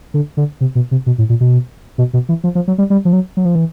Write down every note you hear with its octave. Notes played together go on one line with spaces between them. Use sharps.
D3
D3
C3
B2
C3
B2
A2
A#2
B2
B2
B2
E3
F3
F3
F#3
G3
G3
F3
F#3
F#3
F3
E3